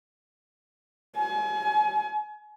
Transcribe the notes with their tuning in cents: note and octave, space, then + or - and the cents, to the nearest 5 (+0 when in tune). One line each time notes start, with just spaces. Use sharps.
G#5 +35